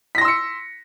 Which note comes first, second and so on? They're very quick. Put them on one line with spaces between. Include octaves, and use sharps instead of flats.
B6 A#6 C6 E6 C#7